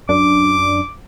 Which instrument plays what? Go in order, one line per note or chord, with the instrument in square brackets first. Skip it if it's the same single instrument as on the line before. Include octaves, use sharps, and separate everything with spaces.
[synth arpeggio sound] F#2 D4 [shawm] D6